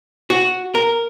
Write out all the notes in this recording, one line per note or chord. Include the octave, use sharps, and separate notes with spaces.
F#4
A#4